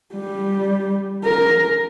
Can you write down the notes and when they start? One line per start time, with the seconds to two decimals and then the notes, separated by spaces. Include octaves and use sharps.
0.15 G3
1.25 A#4